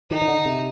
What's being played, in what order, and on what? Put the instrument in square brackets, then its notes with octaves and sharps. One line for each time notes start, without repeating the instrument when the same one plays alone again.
[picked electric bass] D#3 [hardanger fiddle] D#4
[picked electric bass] D#3
D3
C3